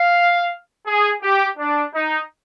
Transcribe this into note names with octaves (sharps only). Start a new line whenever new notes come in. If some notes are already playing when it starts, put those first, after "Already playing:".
Already playing: F5
G#4
G4
D4
D#4